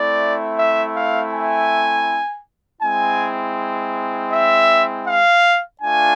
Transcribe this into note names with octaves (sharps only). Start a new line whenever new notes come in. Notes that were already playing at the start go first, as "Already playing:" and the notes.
Already playing: A3 C4 E4 D5
E5
F5
G#5
G#3 C4 E4 G#5
E5
F5
A3 D4 F4 G#5